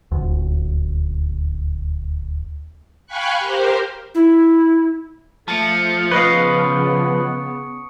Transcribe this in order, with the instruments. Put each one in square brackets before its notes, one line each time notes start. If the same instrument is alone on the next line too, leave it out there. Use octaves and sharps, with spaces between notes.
[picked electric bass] D#1 D2
[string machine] F5 G5 G#5 B5 C#6 F#6
G4 A#4 C5
[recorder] E4
[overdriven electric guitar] F3 [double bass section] A3 [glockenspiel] A5 C#7
[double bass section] C#3 B3 [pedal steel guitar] B4 D#5 F5 [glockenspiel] C#6 D#6 D7